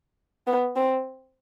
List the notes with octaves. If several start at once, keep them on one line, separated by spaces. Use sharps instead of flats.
B3
C4